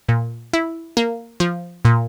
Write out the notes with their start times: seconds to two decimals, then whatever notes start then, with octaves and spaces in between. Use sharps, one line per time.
0.09 A#2
0.53 E4
0.97 A#3
1.40 F3
1.85 A#2